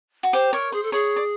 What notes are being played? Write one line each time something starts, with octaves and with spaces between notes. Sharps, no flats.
F#4
G4 C5
A#4 C#5
G#4 C5
A4
G#4 C#5
D5